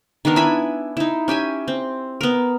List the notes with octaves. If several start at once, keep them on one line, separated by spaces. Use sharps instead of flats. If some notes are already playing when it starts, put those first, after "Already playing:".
D#3 B3 D4 A#4
E4 E5 G#5 B5
D#4 E4
C#4 G4 E5 G#5
C4
B3 A#4